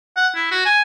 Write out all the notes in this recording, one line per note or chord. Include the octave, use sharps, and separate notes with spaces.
F#5
E4
F#4
G#5